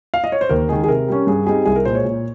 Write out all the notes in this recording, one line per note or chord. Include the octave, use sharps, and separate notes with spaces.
F5
D#5
C#5
C5
D#2 A#4
D#3 G#3 G#4
G#4
C3 A#4
G3 C#4
G2 G#4
G3 C4 D#4 G#4
C2 G#4
A#4
A#2 G#3 C5
C#5
A#2